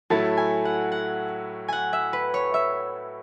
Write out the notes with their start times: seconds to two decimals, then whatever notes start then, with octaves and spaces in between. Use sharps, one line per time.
0.10 A2 F#3 A3 E4 A4 A5
0.37 G#5
0.65 F#5
0.92 F#5
1.68 F#5 G#5
1.93 E5
2.13 B4
2.34 C#5
2.54 E5